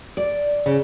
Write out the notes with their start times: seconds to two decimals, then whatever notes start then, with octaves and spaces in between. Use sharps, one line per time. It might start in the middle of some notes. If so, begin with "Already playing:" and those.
0.17 D5
0.66 C#3